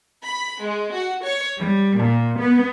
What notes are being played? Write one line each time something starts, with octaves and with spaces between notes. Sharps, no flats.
B5
G#3
F#4
C#5
G3
A#2
B3